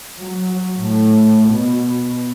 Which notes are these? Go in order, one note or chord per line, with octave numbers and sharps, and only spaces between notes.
F#3
A2
B2